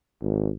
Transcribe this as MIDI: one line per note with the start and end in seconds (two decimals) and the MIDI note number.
0.22 0.50 32